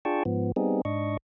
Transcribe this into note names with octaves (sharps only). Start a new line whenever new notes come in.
D4 F4 G#4 G5 A5 C#6
G#2 F3 B3
G3 B3 C4 D#4 G#4
G#2 D4 D#5 C#6